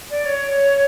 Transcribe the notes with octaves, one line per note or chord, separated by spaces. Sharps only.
D5
C#5